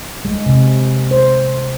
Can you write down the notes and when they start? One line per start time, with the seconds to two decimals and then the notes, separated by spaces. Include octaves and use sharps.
0.25 G#3
0.46 C3
1.11 C5